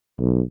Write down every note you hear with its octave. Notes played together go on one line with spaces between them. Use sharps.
B1